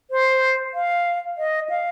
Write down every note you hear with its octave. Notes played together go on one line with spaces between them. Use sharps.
C5
F5
D#5
F5